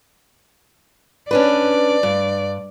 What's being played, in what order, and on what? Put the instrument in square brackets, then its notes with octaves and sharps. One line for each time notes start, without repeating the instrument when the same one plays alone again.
[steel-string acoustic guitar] C#4 D4 B4 [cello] D5
[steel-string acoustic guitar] G2